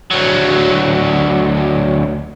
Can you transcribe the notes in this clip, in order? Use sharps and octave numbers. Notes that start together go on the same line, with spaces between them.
D2 F#3